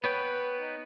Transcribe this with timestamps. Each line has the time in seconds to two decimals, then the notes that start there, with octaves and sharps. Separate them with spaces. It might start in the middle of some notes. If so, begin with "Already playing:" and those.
0.04 B3 B4 C#5 G5
0.59 D#4